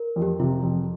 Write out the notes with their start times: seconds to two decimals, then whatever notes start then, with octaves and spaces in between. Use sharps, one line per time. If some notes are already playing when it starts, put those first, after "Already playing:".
Already playing: A#4
0.16 F2
0.22 G4
0.39 C3 F4
0.63 F2